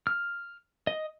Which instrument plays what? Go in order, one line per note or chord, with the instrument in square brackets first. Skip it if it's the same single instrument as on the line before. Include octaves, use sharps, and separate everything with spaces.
[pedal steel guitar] F6
D#5